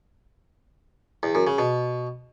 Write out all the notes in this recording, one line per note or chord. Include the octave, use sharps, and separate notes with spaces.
E2
F#2
C#3
B2